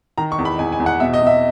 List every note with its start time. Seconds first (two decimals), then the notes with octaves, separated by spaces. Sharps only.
0.18 D#3 A#5
0.32 C#6
0.38 E2
0.45 B5
0.59 E2 G#5
0.72 G#5
0.80 E2
0.86 F#5
1.00 B2 E5
1.14 D#5
1.21 B2
1.27 E5